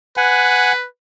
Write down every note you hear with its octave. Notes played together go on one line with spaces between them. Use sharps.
B4 F#5 G#5